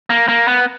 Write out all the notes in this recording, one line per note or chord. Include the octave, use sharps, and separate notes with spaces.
A#3
A#3
B3